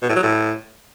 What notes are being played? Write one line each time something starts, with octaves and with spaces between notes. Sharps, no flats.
B2
A2
F#3
A2